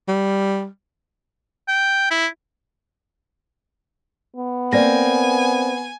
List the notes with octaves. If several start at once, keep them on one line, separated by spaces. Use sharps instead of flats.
G3
G5
E4
B3
A#3 C4 D5 G#5 A#6